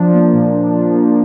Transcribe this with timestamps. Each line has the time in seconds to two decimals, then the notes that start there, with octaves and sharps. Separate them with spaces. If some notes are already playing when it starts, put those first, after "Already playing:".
Already playing: F3 D4
0.13 A#3
0.33 A#2
0.53 D4
0.73 F3
0.93 A#3